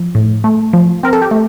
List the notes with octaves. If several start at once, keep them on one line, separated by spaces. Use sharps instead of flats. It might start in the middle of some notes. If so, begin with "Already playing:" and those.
Already playing: F3
A2
A3
F3
C4 A#4
A4
G4
A3